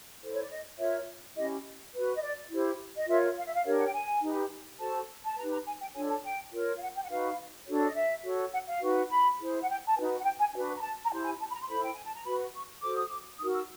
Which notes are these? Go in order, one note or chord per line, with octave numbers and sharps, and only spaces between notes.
E4 A4 C5
C#5
D5
D#5
F4 A#4 C#5 E5
C#4 E4 G4 D#5
F#4 B4
D#5
D5
E4 G4 C5
D#5
F4 A#4 C#5 E5
F5
E5
F5
D4 G4 A#4 C#5
F#5
G5
G#5
D#4 G4 B4
F#4 A4 C5 A5
A5
D#4 G4 B4 A#5
A#5
G#5
G5
D4 F4 A4 C#5 G#5
A5
G5
F4 A#4 C#5
F5
F#5
G5
F#5
D#4 F#4 B4 F5
D4 F#4 A4 C#5
D5
D#5
E5
F#4 A4 C#5
F#5
F5
D#4 F#4 B4
B5
E4 G#4 C5
F#5
G5
A5
D#4 F#4 B4 G#5
F#5
G5
G#5
D4 F#4 B4 G#5
A#5
A5
A#5
E4 G4 C5 A5
G#5
A5
B5
A#5
C6
E4 A4 C5 B5
G5
G#5
A5
A#5
F#4 B4 B5
C#6
F#4 A4 C5 D6
D#6
D6
D#4 F#4 A#4 D#6
E6